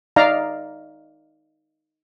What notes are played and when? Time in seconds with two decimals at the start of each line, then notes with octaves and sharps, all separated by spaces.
0.16 D#4 D5 F5 A#5